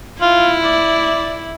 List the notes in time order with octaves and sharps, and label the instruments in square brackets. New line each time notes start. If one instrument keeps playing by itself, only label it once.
[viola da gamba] E4 [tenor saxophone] F4
[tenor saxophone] D5